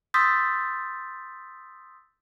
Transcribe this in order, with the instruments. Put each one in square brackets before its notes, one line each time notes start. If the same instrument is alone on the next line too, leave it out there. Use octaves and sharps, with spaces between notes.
[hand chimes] C6 D#6 E6 G6 A6 B6